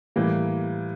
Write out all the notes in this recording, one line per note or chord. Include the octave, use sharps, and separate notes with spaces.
A2 E3 G3 A#3